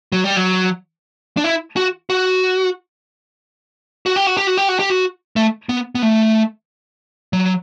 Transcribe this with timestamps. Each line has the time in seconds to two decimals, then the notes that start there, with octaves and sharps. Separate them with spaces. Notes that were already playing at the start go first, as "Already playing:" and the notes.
0.12 F#3
0.24 G3
0.36 F#3
1.37 D4
1.44 E4
1.76 F#4
2.10 F#4
4.06 F#4
4.16 G4
4.27 F#4
4.37 G4
4.47 F#4
4.58 G4
4.69 F#4
4.79 G4
4.90 F#4
5.36 A3
5.69 B3
5.95 B3
6.02 A3
7.33 F#3